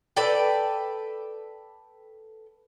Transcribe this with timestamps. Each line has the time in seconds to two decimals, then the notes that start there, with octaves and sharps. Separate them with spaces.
0.16 A4 B4 D5 G5